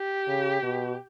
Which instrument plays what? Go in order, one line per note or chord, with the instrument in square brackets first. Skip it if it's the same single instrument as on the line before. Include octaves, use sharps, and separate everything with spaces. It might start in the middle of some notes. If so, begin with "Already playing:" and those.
Already playing: [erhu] G4
[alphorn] C#3
B2